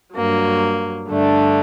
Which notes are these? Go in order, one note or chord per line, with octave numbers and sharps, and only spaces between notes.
G2 F#3 A#3
G2 D3 A3 D4